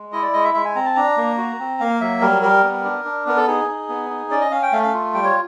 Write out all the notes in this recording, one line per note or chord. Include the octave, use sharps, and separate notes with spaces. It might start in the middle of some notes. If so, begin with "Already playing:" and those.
Already playing: G#3
E4 D#5
D5
G#3 D#5
E5
G#3 E5
G#5
C4 A#5
A5
D4 A#5
A#3
F#4
C4
A#3 F5
F#3 E5
G3 A#4
G3 A#4
B3
D4
D4
B3 A#4
A4
D#4 G#4
D#4
B3
D#4
C#4 D5
D#5
C#4 F5
G5
A3 F5
F5
F4
G3 G5
C#5